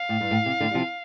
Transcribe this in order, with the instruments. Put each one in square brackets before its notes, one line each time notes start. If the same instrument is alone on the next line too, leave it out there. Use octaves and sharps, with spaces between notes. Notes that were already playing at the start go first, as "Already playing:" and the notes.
Already playing: [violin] F5
[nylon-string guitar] A2
G2
A2
C3
A2 D3
G3
C3 F3